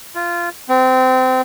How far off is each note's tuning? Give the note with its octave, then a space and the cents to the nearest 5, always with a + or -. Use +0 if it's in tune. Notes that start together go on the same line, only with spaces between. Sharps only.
F4 -15
C4 -25